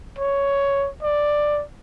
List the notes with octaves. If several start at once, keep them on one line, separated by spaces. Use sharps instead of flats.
C#5
D5